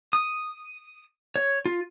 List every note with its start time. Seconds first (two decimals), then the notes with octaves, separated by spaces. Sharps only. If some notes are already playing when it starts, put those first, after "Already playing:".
0.13 D#6
1.36 C#5
1.66 F4